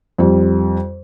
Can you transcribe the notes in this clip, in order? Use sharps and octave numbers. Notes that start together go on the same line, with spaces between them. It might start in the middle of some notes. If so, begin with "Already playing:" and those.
F2 G3